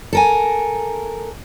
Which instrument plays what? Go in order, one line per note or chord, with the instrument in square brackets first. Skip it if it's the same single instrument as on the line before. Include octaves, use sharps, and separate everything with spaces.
[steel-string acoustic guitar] A4 A#4 G#5